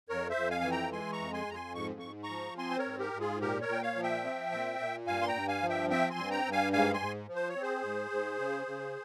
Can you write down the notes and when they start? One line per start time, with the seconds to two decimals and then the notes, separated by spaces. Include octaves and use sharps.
0.09 F2 A#4 C#5
0.30 C5 E5
0.36 F2
0.50 F5 G#5
0.61 E3 G#5
0.71 G5 A#5
0.92 G#3 G#5 C6
1.12 A#5 C#6
1.19 F2
1.33 G#5 C6
1.47 F2 A#5
1.54 G#5 C6
1.75 G#2 C#6
2.00 G#2 C#6
2.23 A#5 C#6
2.30 F3
2.58 C4 G#5 C6
2.71 C5
2.78 A#4 C#5
2.86 G#2
2.99 G4 A#4
3.13 G#2
3.20 F4 G#4
3.40 A#2 G4 A#4
3.61 A#4 C#5
3.68 A#2 G5
3.82 C#5 F5
3.96 F3
4.03 E5 G5
4.24 C4
4.52 A#2
4.79 A#2
5.07 G2 F5 G#5
5.22 C6
5.28 G5 A#5
5.34 G2
5.48 F5 G#5
5.62 F3
5.69 E5 G5
5.90 C4 E5 G5
6.10 G#5 C6
6.18 G2
6.31 G5 A#5
6.45 G2
6.52 F5 G#5
6.73 G#2 F5 G#5
6.93 G#5 C6
7.00 G#2
7.28 F3
7.35 C5
7.49 C#5
7.56 C4
7.62 G#4 C5
7.83 G#2
8.11 G#2
8.39 C#3
8.67 C#3